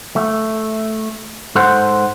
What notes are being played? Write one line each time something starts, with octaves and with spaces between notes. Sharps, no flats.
A3
G#2 A4 C5 F#5 C6